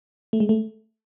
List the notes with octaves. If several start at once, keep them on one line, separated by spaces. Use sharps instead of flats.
A3
G#3
A3